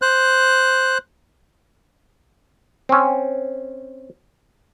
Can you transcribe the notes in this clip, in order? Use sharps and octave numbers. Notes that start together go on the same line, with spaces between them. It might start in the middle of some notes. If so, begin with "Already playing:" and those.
C5 F#6
C4 C#4